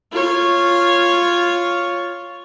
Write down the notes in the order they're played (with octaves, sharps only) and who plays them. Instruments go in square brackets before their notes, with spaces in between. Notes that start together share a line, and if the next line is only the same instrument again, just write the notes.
[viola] F4 C#5